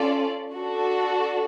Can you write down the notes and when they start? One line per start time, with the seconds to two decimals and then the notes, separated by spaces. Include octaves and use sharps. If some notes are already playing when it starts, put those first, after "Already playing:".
Already playing: C#4 F4 A4 D5
0.54 D4 F#4 A4